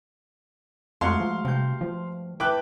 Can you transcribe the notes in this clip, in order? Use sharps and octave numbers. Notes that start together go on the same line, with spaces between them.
F2 G#2 A3 F#4 F5 C6
F3
G2 C3 G6
F3
E4 B4 G5 A5 D6 F#6